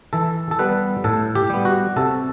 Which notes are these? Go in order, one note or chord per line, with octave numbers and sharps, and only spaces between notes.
E3 A4
A4
G3 B3 B4
A2 A4
G4
G3 B3
F#4
C3 A4